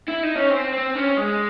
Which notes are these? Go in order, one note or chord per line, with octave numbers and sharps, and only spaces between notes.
E4
D#4
C#4
C4
C4
C#4
G#3